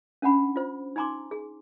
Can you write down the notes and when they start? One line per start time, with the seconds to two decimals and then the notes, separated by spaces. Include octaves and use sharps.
0.22 C#4 D4 F#5 B5
0.56 F4 C5
0.96 D#4 G#5 A#5 C6 D6
1.31 G#4